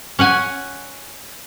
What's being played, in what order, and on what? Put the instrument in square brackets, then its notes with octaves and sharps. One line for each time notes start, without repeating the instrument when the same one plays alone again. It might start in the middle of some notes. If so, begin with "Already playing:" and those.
[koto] C#4 F#5 G#5